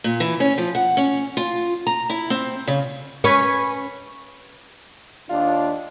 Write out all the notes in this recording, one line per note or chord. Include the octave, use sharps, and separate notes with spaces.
A#2
E3
C#4
F3
F#5
C#4
F4
A#5
E4
C4
C#3
C#4 B4 C#5
D#2 D4 F4